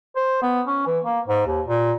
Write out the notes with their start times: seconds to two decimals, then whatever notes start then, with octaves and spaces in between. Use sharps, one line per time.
0.16 C5
0.43 B3
0.67 C#4
0.87 E3
1.05 A#3
1.28 G#2
1.47 D#2
1.67 A#2